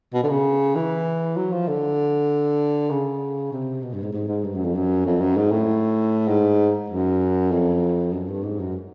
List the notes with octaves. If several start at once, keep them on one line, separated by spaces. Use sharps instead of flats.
B2
D3
C#3
E3
F#3
F3
D3
C#3
C3
B2
G2
G#2
G#2
G#2
G2
F#2
F2
F#2
F2
F#2
G#2
A2
G#2
F#2
F2
F#2
G2
G#2
F#2